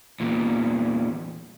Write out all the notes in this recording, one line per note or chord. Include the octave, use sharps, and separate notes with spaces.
E2 A#2